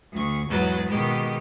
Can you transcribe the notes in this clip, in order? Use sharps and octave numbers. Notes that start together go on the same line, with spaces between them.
D2 C#6
E2 G#2 F#3 B4 A6
B2 D#3 G#3 A#3 G4